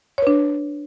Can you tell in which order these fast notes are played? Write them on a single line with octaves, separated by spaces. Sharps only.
C#5 B4 D4